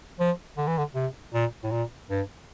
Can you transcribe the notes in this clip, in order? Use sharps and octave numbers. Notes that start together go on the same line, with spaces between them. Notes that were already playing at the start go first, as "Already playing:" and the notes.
F3
D3
E3
D3
C3
A#2
A2
A#2
G2